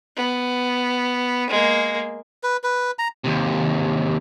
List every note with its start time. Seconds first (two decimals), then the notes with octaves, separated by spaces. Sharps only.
0.17 B3
1.50 G#3 A#3
2.43 B4
2.63 B4
2.99 A#5
3.24 D#2 C3